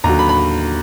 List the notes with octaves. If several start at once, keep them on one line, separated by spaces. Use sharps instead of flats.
D#2 D3 F#3 A#5
B5
B5